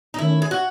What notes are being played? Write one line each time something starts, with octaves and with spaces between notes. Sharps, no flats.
D#4
D#3 A3 C#4 E4
G#4
F#4